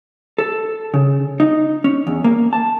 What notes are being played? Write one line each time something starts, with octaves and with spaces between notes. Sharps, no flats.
A4
C#3
D#4
C#4
E2
A#3
A5